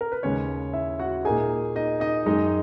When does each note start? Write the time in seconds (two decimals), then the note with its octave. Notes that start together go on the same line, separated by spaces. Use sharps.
0.01 A#4
0.12 B4
0.23 D#2 C#3 G#3 C#4 C#5
0.73 E4 E5
0.99 F#4 F#5
1.25 A#2 A#3 D#4 G#4 G#5
1.76 D#4 D#5
2.00 D#4 D#5
2.26 F#2 D#3 G#3 D#4 D#5